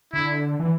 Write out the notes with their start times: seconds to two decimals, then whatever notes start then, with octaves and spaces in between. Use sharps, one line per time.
0.13 D3 E4
0.60 E3